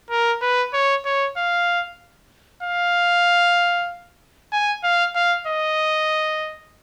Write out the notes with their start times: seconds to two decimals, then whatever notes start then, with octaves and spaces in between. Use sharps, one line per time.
0.10 A#4
0.42 B4
0.74 C#5
1.05 C#5
1.37 F5
2.63 F5
4.52 G#5
4.84 F5
5.15 F5
5.47 D#5